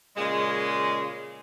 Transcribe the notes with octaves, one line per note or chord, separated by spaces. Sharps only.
A#2 C#3 G#3